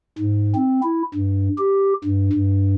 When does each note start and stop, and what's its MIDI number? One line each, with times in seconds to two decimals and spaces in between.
0.19 0.54 44
0.55 0.81 60
0.84 1.03 64
1.14 1.49 43
1.58 1.93 67
2.05 2.29 43
2.33 2.75 43